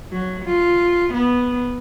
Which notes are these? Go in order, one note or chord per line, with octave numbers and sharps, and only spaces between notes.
F#3
F4
B3